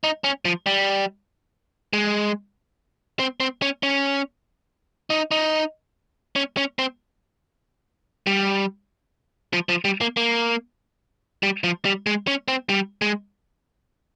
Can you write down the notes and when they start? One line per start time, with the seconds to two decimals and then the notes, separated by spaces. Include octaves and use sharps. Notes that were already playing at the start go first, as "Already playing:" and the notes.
0.04 D#4
0.24 C#4
0.45 F3
0.66 G3
1.93 G#3
3.19 C4
3.40 C4
3.62 C#4
3.83 C#4
5.10 D#4
5.31 D#4
6.36 C#4
6.57 C#4
6.79 C4
8.27 G3
9.53 F3
9.69 F3
9.85 G3
10.01 A#3
10.17 A#3
11.43 G3
11.64 F3
11.85 G3
12.06 G#3
12.27 C#4
12.48 C4
12.69 G3
13.02 G#3